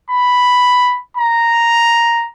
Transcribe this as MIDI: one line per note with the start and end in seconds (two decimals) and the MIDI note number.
0.10 0.98 83
1.17 2.28 82